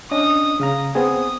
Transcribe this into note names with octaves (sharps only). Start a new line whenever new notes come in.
C#4 D4 D#5 D#6
C#3 F5 A#5
B3 C4 G#4 D#6